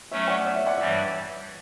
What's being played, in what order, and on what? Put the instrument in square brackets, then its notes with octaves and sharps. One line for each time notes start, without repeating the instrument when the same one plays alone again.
[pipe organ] F#3 A3 C#4 [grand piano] C#5 E5
[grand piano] D5 F#5
C#5 E5
C#5 E5
D5 F#5
[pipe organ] G2 E3 G3 [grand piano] C#5 E5